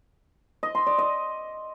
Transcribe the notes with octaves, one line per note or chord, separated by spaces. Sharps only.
D#5
C6
D5
D#5